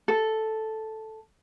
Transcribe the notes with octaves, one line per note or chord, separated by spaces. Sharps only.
A4